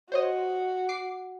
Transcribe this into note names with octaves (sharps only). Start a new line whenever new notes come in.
F#4 C5 C#5 D#5
D6 C7